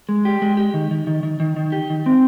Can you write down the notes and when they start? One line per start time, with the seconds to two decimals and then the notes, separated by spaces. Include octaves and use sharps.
0.09 G#3
0.25 G4
0.42 G#3
0.57 G4
0.74 D#3
0.91 D#3
1.07 D#3
1.23 D#3
1.40 D#3
1.56 D#3
1.72 G4
1.90 D#3
2.06 C4